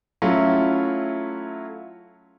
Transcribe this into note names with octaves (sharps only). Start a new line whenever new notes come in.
F#3 A3 C#4 E4 F4